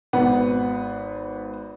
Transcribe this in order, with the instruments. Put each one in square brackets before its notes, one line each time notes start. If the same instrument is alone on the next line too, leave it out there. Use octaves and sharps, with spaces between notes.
[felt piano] G#1 B3 B4 F#5